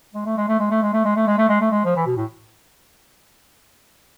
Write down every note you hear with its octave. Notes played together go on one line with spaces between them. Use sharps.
G#3
A3
G#3
A3
G#3
A3
G#3
A3
G#3
A3
G#3
A3
G#3
A3
G#3
F3
E3
B2
A2